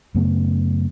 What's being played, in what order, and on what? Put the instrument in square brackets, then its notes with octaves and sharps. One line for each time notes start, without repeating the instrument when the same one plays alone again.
[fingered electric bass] F#2 C#3 A3 B3